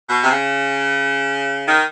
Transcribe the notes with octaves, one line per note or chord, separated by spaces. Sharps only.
B2
C3
C#3
D#3